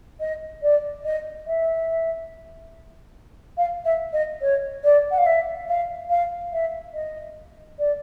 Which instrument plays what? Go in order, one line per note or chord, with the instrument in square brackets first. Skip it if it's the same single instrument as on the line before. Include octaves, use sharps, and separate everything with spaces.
[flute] D#5
D5
D#5
E5
F5
E5
D#5
C#5
D5
F#5
F5
E5
F5
F5
E5
D#5
D5